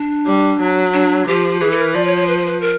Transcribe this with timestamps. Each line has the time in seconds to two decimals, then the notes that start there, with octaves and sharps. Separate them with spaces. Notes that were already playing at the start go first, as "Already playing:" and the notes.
Already playing: D4
0.26 G3
0.60 F#3
0.94 D4
1.27 F3 G4
1.60 E3 G#4
1.71 A4
1.77 A#4
1.94 F3 D5
2.06 C#5
2.16 C#5
2.28 B4
2.37 C5
2.46 B4
2.61 A#4